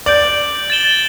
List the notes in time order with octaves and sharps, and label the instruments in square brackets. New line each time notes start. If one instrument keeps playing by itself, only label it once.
[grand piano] D5 [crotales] G6 D7 F#7
[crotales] A6 E7 G7